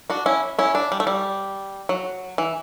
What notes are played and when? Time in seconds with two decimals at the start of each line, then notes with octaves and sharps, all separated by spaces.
0.10 D4 F#4
0.26 C#4 E4
0.59 C#4 E4
0.75 D4
0.92 G3
1.00 A3
1.07 G3
1.89 F#3
2.38 E3